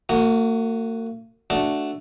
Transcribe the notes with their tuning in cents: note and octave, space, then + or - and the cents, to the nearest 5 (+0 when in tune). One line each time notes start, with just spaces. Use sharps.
A#3 -45 F#4 +0
A3 +0 D4 +0 F#4 +0